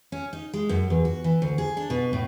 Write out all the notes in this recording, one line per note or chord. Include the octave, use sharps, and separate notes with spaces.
C#4
D#4
G#3
F#2
E2
F#4
E3
D2
G#4
D4
B2
A2